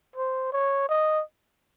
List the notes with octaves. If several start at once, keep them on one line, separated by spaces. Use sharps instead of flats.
C5
C#5
D#5